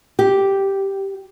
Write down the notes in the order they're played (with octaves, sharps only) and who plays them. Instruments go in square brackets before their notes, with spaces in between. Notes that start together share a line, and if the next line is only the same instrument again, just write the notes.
[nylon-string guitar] G4